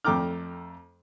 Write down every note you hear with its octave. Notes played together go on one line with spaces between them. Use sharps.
F2 A3 G5 A#5 D6 F6